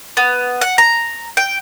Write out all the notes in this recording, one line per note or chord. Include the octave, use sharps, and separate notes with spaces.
B3
F#5
A#5
G5